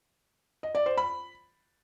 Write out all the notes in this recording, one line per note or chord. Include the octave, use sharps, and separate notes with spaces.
D#5
D5
C5
B5